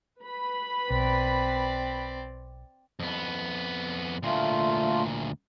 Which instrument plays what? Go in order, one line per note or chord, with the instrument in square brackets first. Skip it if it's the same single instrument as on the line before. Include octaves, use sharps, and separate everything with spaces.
[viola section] B4 B5
[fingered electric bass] B1 [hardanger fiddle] C4 D5
[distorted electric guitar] F2 B3
[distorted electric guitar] D2 A#2 [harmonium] A3 F4